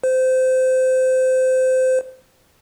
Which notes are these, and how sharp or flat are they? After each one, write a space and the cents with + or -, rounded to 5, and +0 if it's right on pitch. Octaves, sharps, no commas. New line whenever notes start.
C5 -20